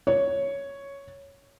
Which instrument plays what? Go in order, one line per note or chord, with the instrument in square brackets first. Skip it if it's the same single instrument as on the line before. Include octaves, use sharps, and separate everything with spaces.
[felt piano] C#5